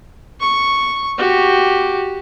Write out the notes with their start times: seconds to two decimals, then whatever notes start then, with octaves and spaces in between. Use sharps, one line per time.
0.40 C#6
1.18 F#4 G4